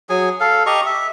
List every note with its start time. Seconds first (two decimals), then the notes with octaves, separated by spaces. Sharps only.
0.09 F#3 G#4 G#5
0.40 A4 F5
0.66 G4 D#5 A#5 C#6
0.86 E5